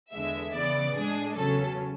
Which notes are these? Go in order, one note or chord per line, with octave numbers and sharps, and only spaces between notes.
E2 D3 G#3 E5
C#3 E3 B3 D5
A2 G#3 D4 G#4
E2 C#3 F#3 C#4 A4